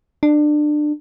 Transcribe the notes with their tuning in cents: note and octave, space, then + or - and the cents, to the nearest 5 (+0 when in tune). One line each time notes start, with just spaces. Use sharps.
D4 +25